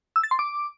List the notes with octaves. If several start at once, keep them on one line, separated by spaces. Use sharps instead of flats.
E6
A6
C6
D6